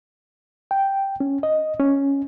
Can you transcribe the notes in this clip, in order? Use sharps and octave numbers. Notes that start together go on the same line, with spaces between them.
G5
C#4
D#5
C#4